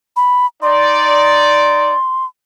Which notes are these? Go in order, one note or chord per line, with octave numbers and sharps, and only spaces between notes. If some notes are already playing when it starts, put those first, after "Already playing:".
B5
D#4 D5 C6